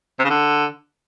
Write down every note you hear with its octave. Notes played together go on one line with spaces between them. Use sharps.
C3
C#3
D3